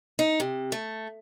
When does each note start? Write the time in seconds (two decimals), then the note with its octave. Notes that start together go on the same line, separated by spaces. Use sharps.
0.19 D#4
0.40 C3
0.72 A3